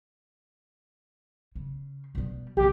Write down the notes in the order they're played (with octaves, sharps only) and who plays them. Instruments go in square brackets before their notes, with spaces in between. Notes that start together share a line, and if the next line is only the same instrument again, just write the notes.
[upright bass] C#3
B2 G3
[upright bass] B1 C3 [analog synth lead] G4